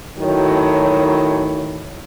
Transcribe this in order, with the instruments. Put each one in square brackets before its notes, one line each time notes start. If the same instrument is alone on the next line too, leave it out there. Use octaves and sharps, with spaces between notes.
[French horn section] A2 D#3 F#3